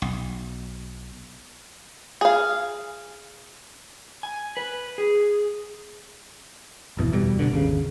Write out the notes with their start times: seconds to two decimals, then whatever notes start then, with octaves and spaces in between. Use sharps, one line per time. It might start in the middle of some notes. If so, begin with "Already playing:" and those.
0.02 B1
2.21 G#4 F5
4.23 G#5
4.57 B4
4.98 G#4
6.97 G#1 F2 B2 E3
7.12 D#1 F2 B2 G3
7.39 F#1 C#2 B2 D3
7.52 G#1 D#2 C#3